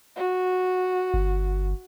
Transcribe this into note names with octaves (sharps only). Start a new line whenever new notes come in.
F#4
G1